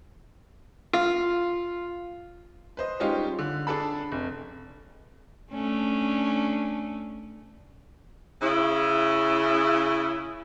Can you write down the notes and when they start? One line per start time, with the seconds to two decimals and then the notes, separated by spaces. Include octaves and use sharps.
0.93 F4
2.77 B4 C5 D#5
3.00 G3 G#3 C#4 D#4 F4 G4
3.39 D3
3.67 D4 G#4 A4 A5 B5
4.12 F1
5.52 A3 C#4 D4
8.41 C#3 E4